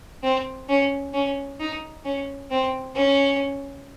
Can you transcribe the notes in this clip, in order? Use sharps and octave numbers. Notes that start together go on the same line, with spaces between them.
C4
C#4
C#4
D#4
C#4
C4
C#4